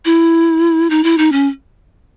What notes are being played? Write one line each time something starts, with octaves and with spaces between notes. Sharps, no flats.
E4
D#4
E4
D#4
C#4